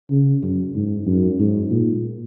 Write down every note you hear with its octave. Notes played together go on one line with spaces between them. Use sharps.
C#3
F#2
G#2
F#2
G#2
A#2